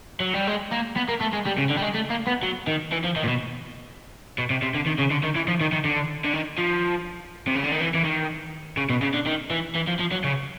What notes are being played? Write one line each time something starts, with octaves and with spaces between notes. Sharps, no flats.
F#3
G3
G#3
A#3
B3
A#3
A3
G#3
G3
C#3
D3
G3
G#3
A3
A#3
B3
F#3
D#3
E3
F3
D#3
A#2
B2
B2
C3
C3
D3
D#3
C#3
D3
D#3
E3
F3
D#3
D#3
D3
D3
D#3
F3
C3
C#3
D3
D#3
E3
E3
D#3
C#3
B2
C#3
D3
D#3
E3
E3
F3
F3
F#3
C#3